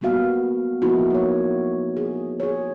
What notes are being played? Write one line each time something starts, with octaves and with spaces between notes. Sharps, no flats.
G3 A#3 B3 F#4 F5
F3 A#3 B3 D#4 E4 F#4
A#3 C#5
G#4
G#4 C#5